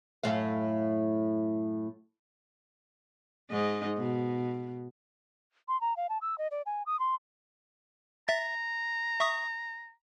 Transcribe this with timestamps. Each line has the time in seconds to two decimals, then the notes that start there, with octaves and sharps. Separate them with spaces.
0.23 F#2 A2 F5
3.51 G#2 D#4 D#5
3.97 B2
5.68 C6
5.81 A#5
5.96 F5
6.09 A5
6.21 E6
6.38 D#5
6.51 D5
6.66 G#5
6.86 D#6
6.99 C6
8.28 E5 A#5 A6
9.20 E5 C#6 D#6